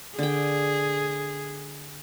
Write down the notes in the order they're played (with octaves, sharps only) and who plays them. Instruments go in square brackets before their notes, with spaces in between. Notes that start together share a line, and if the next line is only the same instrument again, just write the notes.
[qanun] D3 G5 [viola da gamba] G#4